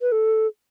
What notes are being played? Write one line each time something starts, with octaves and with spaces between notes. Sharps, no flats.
B4
A4